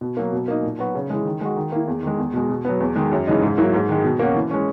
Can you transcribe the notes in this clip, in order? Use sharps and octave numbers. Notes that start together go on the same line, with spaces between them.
B2
F#3 A#3
B2
A#3 D#4
A#2
F#3 B3 F#4
C#3
E3 G#3
D#3
G#3 D#4 F#4
D#3
A#3 E4
E2
D#3 G#3
E2
B2 G#3
B2
F#3 B3
E2
D#3 G#3
F#2
C#3 E3 G#3 D#4
G#2
F#3 A#3 E4
G#2
D#3 G#3
B2
A#3 C#4 F#4
E3
G#3 C#4